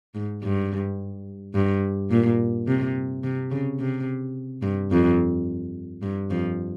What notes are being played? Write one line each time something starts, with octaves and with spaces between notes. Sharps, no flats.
G#2
G2
G2
A#2
C3
C3
C#3
C3
G2
F2
G2
F2 F3